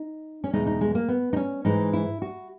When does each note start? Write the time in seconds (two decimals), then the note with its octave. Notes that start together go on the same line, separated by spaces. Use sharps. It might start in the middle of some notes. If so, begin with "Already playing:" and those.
Already playing: D#4
0.44 C#4
0.53 E2 B2 G#3 D#4
0.66 D#4
0.81 G#3
0.95 A#3
1.08 B3
1.33 D#4
1.36 C#4
1.65 G#2 E3 G#3 D#4
1.93 E4
2.22 F#4